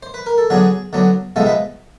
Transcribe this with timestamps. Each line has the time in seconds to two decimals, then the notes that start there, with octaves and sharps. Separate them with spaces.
0.03 C5
0.14 B4
0.26 A#4
0.38 A4
0.50 D3 F#3 B3 D4 G#4
0.93 D3 F#3 B3 D4
1.36 C3 F3 G#3 B3 A4
1.47 B4